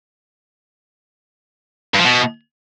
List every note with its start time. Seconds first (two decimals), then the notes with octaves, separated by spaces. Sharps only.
1.94 G2
1.99 F3
2.04 B2